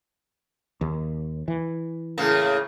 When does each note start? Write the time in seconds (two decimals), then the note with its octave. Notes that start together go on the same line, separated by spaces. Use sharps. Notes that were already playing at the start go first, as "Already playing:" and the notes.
0.81 D#2
1.48 E3
2.18 A2 C#3 A#3